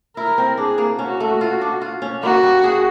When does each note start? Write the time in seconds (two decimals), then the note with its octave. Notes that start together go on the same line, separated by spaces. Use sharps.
0.16 E4 A#4
0.38 C4
0.58 D4 G#4
0.78 A#3
0.99 C#4 F#4
1.20 A3
1.41 F4
1.61 D4
1.81 F4
2.02 C#4
2.23 A#3 F#4
2.43 G3
2.64 G#4